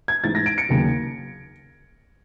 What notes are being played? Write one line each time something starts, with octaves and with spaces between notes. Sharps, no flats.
G#6
A1 G#2 E3 A6
A#6
D7
C#7
D#2 C#3 F#3